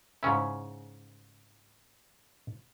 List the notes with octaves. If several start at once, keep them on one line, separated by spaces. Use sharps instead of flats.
G#2 C#3 C#4 E4